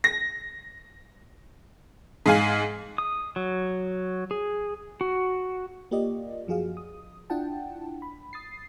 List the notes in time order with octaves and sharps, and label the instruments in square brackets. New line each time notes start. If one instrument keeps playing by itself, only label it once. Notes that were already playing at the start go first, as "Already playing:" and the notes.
[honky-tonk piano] A#6
G#2 F5 G#5
[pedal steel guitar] D#6
F#3
G#4
F#4
[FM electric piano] A#3 F4 G4 D5 D#5
F#2 F3 F#4 G#4 F5
D#6
D4 E4 F4 F#5 G5 A5
B5
D#6 A6 C7